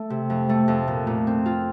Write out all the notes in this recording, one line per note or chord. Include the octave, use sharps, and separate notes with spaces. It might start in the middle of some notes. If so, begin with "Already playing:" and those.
Already playing: A3
C3
F2
A3
F2
A#2
A#2
C4
F4